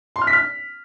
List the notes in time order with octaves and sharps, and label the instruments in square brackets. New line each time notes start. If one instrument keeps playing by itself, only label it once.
[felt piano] C6
F6
B6
F6